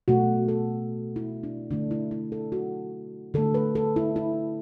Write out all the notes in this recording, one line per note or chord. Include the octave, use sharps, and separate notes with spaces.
B2 A3 F#4
A4
E4
D4
D3 A3 D4
E4
E4
A4
F#4
D3 A3 A4
B4
A4
E4
E4